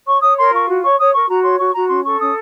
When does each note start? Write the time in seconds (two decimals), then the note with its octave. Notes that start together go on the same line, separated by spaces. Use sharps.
0.07 C#5 C#6
0.22 C#5 D#6
0.38 A#4 C6
0.53 F4 C#6
0.67 F#4
0.83 C#5 C#6
0.98 C#5 D#6
1.13 A#4 C#6
1.29 F#4 A#5
1.44 C#5 C6
1.59 F#4 C#6
1.74 F#4 A#5
1.89 C#4 C6
2.04 A4 C#6
2.20 C#4 D#6